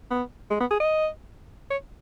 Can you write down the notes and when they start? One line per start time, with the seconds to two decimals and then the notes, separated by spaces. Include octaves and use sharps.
0.11 B3
0.50 G#3
0.60 B3
0.71 G#4
0.80 D#5
1.70 C#5